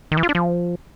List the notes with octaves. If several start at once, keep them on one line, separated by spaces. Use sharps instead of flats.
D#3
E3
F4
D4
F3